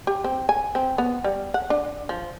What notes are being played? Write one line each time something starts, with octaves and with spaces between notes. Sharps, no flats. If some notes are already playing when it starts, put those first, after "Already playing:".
G4
C4
G#5
C4
B3
G3
F#5
D4
F3